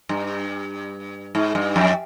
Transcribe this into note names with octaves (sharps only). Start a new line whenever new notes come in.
G2
G#2
G2
F2